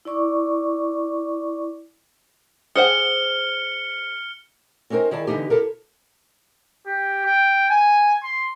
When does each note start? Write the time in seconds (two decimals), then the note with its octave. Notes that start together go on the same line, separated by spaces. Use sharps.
0.05 E4 D5 C#6 D6
2.76 G#4 C5 F#5 F6 C#7 G7
4.90 C4 C#4 D#4 G4 A#4 C5
5.11 D#3 E4 G#4 D5 A5
5.27 D3 E3 B3 D#4 G4
5.50 E4 G4 A4 A#4
6.87 G4
7.25 G5
7.70 G#5
8.23 C6